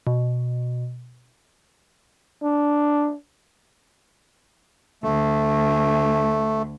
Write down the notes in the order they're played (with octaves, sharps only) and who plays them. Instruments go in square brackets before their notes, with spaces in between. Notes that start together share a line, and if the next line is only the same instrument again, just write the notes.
[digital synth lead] B2
[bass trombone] D4
[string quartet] D2 [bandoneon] A3